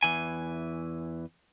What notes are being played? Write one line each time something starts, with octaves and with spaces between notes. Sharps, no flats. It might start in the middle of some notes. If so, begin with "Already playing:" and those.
E2 E3 G#5